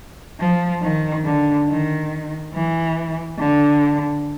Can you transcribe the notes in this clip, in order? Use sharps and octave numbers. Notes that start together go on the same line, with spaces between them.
F3
D#3
D3
D#3
E3
D3